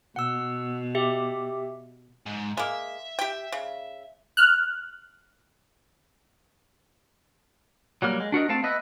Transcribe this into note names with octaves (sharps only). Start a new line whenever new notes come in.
B2 F#5 E6
G4 E5
G#2
G#3 A#3 E5
G4 G5
C#3
F6 F#6
F#3 G3 A#3 F6
G#3
D4 F#4 A#4 D#5
A3 C4 F5 A5
B3 B4 D#5 E5